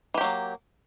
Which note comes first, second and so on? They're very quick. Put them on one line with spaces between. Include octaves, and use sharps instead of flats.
E3 G4 F#3 A#3